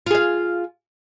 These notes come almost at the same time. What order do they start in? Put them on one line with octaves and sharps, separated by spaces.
F4 G#4 F5